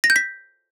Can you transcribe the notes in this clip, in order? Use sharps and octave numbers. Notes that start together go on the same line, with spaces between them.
A#6
G6
B6